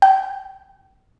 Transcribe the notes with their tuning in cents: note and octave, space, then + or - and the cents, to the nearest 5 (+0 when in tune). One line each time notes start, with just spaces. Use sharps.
G5 -30